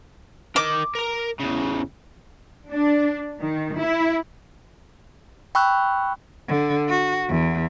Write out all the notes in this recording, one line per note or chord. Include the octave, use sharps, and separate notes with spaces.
A#4 D#5 D6
A#4 A#5
E2 C#3
D4
D#3
E4
G5 B5 C#6 E6 F#6
D3
F#4
E2